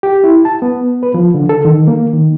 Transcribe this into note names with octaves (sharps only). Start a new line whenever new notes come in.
G4
E4
A5
B3
B4
F3
D3
A4
D#3
A#3
D#3